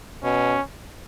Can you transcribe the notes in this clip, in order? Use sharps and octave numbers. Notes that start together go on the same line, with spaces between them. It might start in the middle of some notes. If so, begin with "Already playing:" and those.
B2 C#4